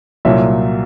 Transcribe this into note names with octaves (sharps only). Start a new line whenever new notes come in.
C2 A#2 F#3 E5